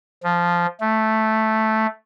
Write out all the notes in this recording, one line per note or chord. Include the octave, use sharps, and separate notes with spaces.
F3
A3